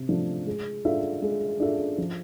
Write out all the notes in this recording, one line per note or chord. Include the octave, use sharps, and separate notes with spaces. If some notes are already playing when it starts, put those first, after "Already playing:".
Already playing: C3
F3 A3 D4
G#3
D4 F4 A4 E5
G#3
D4 F4 A4 E5
F3